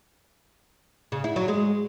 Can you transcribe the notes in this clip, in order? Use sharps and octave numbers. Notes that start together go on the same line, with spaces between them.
C#3
E4
F#3
G#3